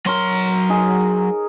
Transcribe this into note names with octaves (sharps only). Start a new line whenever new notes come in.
F#3 A#4 C#5 C6
D#4 G#4